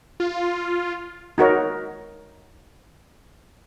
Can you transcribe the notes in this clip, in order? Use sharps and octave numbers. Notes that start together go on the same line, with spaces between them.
F4
D#4 F#4 A#4 C#5